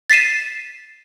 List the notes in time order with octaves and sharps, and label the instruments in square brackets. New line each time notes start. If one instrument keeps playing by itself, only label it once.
[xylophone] A6 B6 C7 D#7 E7